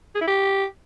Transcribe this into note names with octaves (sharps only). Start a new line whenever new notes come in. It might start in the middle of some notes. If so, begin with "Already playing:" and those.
G#4
E4
G4